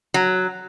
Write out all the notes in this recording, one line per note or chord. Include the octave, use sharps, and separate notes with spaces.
F#3